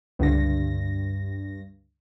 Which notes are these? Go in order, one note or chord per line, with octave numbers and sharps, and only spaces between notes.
C#2 G2 D3 A#6